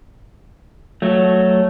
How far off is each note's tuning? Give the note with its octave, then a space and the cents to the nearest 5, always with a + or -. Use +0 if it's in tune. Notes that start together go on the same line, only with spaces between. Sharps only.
F#3 +0 A3 +0